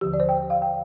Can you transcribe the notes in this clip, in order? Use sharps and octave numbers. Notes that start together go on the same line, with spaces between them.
D#2 D3 F3 G4
D5
C5
G5
F5
G5